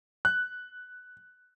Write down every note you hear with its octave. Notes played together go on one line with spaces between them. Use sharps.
F#6